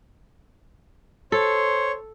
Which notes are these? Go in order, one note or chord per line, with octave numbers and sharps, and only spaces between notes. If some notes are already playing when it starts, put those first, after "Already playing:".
A4 C5 C#5